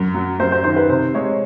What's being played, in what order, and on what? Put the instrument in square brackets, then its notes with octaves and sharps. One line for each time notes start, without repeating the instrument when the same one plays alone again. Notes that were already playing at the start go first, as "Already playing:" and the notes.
Already playing: [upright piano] F#2
F#3
[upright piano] F#2 [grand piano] C5
[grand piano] C5
[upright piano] D#3 [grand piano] C5
[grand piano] B4
[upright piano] C3 [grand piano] C5
[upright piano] G#3 [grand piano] C#5